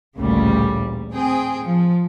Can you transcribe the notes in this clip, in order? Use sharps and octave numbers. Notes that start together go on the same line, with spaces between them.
A1 D2 A#2 C#3 G3
C4 G#4 G5
F3